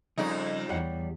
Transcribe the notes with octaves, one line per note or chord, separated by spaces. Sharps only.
F2 C#3 G3 D#4 D5
E2 G3 C#5 F#5